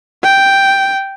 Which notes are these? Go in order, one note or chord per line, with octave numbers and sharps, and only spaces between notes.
G5